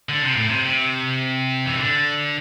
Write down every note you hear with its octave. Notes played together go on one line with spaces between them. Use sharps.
D3
C3
A2
C3
C3
E3
D3